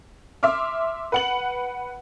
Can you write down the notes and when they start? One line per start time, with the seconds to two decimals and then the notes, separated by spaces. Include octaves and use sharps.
0.43 E5 C6 D6 F6
1.12 B4 F#5 F#7